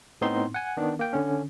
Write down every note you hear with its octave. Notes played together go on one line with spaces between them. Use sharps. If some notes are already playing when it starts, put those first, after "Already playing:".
A2 B3 C4 D#4 C6
F#5 G#5
D#3 B3 D4
A#3 G5
D3 C#4